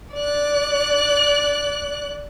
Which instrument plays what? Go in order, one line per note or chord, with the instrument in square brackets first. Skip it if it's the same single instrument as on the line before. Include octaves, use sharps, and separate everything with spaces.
[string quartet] D5 F#6